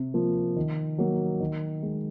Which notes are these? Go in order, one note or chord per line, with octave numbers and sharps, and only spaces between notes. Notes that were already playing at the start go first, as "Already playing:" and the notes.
Already playing: C3
F3 A#3
D#3
F#3 A#3
D#3
G#3